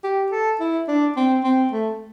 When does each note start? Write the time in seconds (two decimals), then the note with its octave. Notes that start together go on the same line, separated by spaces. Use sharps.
0.04 G4
0.32 A4
0.60 E4
0.88 D4
1.16 C4
1.44 C4
1.72 A3